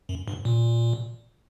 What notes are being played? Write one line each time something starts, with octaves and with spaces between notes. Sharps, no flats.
F#2
G2
A#2